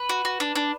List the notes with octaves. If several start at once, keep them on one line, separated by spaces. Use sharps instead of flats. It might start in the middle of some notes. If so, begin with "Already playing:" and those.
Already playing: B4
F#4
F#4
D4
D4